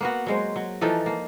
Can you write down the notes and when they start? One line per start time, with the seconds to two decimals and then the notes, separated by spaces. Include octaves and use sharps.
0.01 A#3 B3 F#4
0.26 F#3 G#3 C5
0.56 F#3
0.81 E3 F3 D#4 A4
1.06 A#3